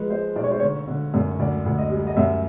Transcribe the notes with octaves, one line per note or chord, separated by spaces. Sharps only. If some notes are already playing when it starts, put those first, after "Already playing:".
Already playing: F3 G#3 B4
G#3 C5
B1 D5
C#5
C5
D3 C#5
D3
F#2
D2 D5
D2
D#5
G3
D#5
F#2 E5